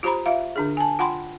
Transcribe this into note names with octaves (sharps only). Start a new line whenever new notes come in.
F4 G4 C5 A#5 B5
F4 E5 F5
D3 D4 G#4
G#5 A5
F4 F#5 G5 B5 C6